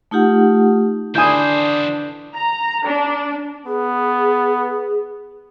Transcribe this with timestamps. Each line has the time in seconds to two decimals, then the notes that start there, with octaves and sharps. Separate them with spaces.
0.11 A3 D#4 F4 G4 F#5
1.15 D3 E3 D4 E4 C5 G#5 D#6 G6
2.34 A#5
2.85 D4
3.66 B3 G#4